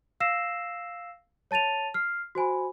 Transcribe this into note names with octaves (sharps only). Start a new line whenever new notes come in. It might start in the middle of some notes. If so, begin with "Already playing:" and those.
F5 E6 A#6 C7 E7
C#5 A5 A6 D#7 F7
F6 C7
F#4 C5 G#5 B5